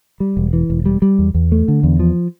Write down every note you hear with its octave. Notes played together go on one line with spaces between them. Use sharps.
G3
E1
E3
E1
G3
G3
E2
E2
A3
D3
E2
F3